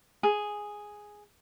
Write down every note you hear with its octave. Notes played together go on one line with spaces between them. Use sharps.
G#4